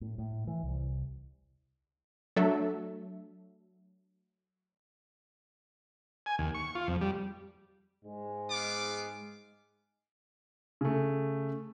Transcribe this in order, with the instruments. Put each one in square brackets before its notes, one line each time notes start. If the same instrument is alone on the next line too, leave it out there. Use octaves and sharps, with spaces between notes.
[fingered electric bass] A2
A2
E3
C2
[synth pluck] F#3 A3 D4 A4 E5
[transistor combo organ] G#5
D#2
C#6
F4
F2
G3
[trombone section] G#2 G#3
[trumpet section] B3 F5 D6
[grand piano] C#3 A3